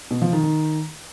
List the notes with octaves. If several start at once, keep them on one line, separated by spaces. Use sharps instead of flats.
B2
F3
D#3
D#3